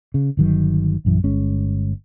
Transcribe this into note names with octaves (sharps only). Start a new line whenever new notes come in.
C#3
G1 D#3 F#3
A#1 F#2 E3
G1 G#3 C#4